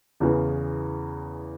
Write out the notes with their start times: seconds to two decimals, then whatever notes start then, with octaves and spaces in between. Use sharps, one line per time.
0.20 E2 C#3 E3